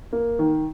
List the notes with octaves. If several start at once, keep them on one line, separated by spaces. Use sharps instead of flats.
A#3
D#3